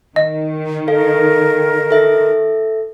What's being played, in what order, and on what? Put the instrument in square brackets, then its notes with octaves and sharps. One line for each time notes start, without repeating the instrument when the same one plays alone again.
[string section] D#3 [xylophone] D#5
[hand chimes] A4 F5 [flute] A#4
[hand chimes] A4 E5 A#6